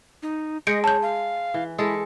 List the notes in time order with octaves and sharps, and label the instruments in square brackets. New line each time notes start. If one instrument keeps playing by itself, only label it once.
[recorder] D#4
[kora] G#3 [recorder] D#5 [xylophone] G6 C#7 D7
[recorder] C#5 [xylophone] A5 G6
[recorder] F5
[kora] E3
[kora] G#3 A4 [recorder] E4